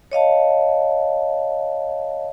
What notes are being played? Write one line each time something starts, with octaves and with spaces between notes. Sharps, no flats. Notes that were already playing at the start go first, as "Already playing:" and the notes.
C#5 D#5 F5 A5